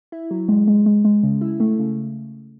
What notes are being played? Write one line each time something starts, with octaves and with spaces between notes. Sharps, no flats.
E4
F#3
G#3
G#3
G#3
G#3
C#3
E4
A3
C#3